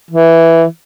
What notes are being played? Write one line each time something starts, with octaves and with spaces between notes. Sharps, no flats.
E3